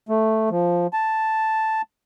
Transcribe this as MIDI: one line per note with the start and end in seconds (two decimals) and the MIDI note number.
0.09 0.49 57
0.50 0.87 53
0.93 1.82 81